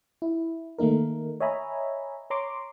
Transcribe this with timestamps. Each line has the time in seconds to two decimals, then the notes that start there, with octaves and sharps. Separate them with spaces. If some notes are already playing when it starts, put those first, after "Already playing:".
0.22 E4
0.78 D#3 A3 A#3 D#4 A#4
1.40 C#5 D#5 E5 G#5 A#5 B5
2.30 C#5 A#5 C6 D6